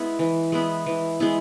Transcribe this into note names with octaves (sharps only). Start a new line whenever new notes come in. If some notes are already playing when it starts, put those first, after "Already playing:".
Already playing: G#3 B3 E4
E3
G#3 B3 E4
E3
G#3 B3 E4